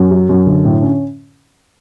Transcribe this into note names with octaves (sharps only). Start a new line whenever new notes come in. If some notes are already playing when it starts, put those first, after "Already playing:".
Already playing: F#2
F#3
F#2
D3
A2
C#4